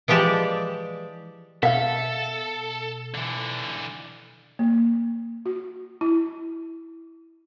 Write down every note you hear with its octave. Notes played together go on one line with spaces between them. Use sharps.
E3 F3 G#3 G4 D5 A5
B2 A4 E5 F5
D3 E3
A#3
F#4
E4